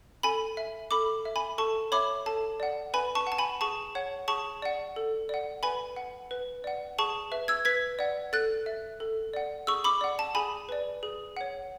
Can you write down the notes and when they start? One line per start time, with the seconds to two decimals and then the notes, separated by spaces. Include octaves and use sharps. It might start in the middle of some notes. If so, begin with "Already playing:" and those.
0.23 A4 G#5 B5
0.57 E5
0.91 A4 B5 D6
1.25 E5
1.36 G#5 B5
1.58 A4 A5 C#6
1.92 C#5 E5 B5 D6
2.26 A4 A5
2.60 D5 F#5
2.94 B4 G#5 B5
3.15 A5 C#6
3.27 F#5
3.32 A5
3.38 G#5 B5
3.61 G#4 A5 C#6
3.95 C#5 F#5
4.28 G#4 A5 C#6
4.62 D5 F#5
4.96 A4
5.29 D5 F#5
5.63 B4 G#5 B5
5.96 F#5
6.31 B4
6.64 D5 F#5
6.99 G#4 A5 C#6
7.32 B4 E5
7.48 E6 G#6
7.65 B4 G#6 B6
7.99 D5 F#5
8.33 A4 F#6 A6
8.66 E5
9.00 A4
9.34 D5 F#5
9.67 G#4 C#6 E6
9.84 B5 D6
10.01 D5 F#5
10.19 A5
10.35 G#4 G#5 B5
10.69 B4 D5
11.03 G#4
11.37 C#5 F#5